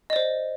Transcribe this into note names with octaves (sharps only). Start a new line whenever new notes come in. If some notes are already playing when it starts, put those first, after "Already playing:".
C5 D5 D#5